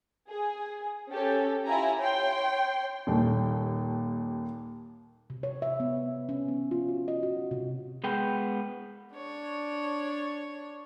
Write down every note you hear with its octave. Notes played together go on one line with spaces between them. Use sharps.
G#4
C#4 G4 A4
E4 F4 G4 G#5 A#5
C#5 G5 C6
D#1 D#2
C3
C#5
E5
B3
C#4
B3
F4
F#4
D#5
F#4
C3
G#3 B3 G5
D4 C#5